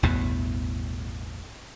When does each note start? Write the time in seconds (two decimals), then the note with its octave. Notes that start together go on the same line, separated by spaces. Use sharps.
0.03 A1 E2 G2 B2